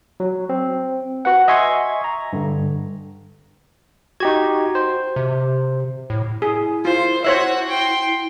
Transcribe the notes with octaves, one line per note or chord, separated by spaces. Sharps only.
F#3
C4
F#4 B4 F#5
D#5 E5 G#5 C6 C#6 G#6
A#5
G2 D3
D#4 F#4 G4 G#6
C5
C3
A2
E4 G#4
F4 C5
F#4 C5 C#5 E5 F#5
G5 C6